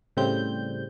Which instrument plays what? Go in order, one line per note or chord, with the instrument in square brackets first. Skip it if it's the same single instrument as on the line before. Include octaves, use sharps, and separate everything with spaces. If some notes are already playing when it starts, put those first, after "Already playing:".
[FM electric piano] A2 C#3 G3 C4 G6